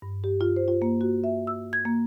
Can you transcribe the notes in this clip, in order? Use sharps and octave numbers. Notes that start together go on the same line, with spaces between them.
G2
G4
F4
C5
F4
A#3
F#4
E5
E6
G#6
A#3